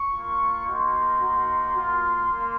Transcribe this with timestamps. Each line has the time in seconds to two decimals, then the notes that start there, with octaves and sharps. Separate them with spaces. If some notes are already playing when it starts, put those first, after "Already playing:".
Already playing: C#6
0.12 A#3 F4
0.66 A#3 D#4 F#4 C6
1.19 A#3 D#4 F#4
1.74 A#3 F4
2.28 A#3